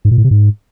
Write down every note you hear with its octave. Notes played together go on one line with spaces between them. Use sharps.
G#2
A#2
A2
C3
G#2